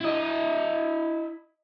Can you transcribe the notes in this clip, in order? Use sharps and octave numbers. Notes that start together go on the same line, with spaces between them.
E4 D#5